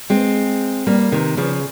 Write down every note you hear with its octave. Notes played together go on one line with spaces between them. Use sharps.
G#3 C4
G3 A#3
C3 D#3
C#3 F3